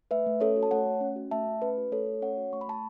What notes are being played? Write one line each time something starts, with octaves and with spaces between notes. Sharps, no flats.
A3 B4 E5
A3
C#4 A4 C#5
F#4
A5
A3 C#5 F#5
A3
C#4
F#4
A3 E5 A5
A3
C#4 B4
F#4
A3 A4 C#5
A3
C#4 C#5 F#5
F#4
A3 C#6
B5
A3 A5